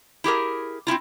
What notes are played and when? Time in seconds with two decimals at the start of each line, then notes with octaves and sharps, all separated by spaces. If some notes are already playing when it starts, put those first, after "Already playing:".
0.24 E4 G4 G#4 A#4
0.87 C4 C#4 E4 F4